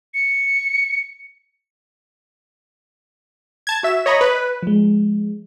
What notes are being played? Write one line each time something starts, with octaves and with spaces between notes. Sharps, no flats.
C#7
A5 G#6
F#4 E5 E7
C#5 D#5 A#5 B5
B4
F3 G#3